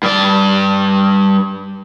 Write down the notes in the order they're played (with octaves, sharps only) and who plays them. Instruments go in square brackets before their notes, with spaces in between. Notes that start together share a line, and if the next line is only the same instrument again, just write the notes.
[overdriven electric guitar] G2 D5